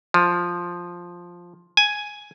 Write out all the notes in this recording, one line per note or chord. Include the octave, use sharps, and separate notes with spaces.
F3
G#5